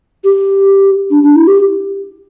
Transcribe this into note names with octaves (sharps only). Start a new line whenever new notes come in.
G4
D4
D4
E4
G4